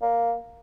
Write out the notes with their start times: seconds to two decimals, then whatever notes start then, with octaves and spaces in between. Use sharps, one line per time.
0.02 A#3